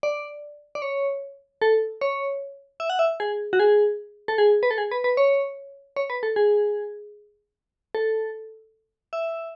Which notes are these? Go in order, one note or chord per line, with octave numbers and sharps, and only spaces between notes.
D5
D5
C#5
A4
C#5
E5
F#5
E5
G#4
F#4
G#4
A4
G#4
B4
A4
G#4
B4
B4
C#5
C#5
B4
A4
G#4
A4
E5